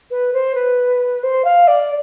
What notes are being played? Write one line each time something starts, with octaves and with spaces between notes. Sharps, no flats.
B4
C5
B4
C5
F5
D5